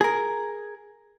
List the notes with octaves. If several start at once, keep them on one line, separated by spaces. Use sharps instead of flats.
G#4 A#4